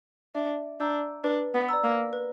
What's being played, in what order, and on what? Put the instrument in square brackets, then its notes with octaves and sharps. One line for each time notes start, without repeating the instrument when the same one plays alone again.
[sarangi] D4 [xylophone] E5
[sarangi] D4 [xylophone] A#5 E6 G6
[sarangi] D4 [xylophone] B4
[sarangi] B3
[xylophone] D5 A#5 E6
[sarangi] A#3
[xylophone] B4